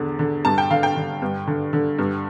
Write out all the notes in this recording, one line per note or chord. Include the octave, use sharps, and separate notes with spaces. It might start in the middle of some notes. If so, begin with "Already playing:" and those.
Already playing: E2 D3
D3
G2 A5
G5
D3 F5
G5
D3
G2
D3
D3
G2